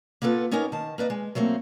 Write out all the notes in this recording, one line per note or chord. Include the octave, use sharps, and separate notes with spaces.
A#3 B3 F4 A4 B4
B3 C#4 D#4 G4 A#4 C#5
D#3 A5
A#3 B4 D5 D#5
G#3
F#3 A3 A#3 C4